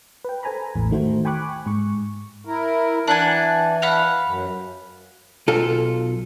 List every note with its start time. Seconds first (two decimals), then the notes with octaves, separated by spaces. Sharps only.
0.25 B4 G5
0.43 A4 C5 G#5 A#5 B5
0.74 A1 E2 A2
0.91 D#3 A3 F#4 C5
1.25 G5 G#5 B5 C#6 D6 F#6
1.66 G#2 C#6
2.45 E4 A#4
3.07 E3 D4 F#5 G#5
3.82 F5 F#5 B5
4.24 F#2
5.48 B1 F4 A4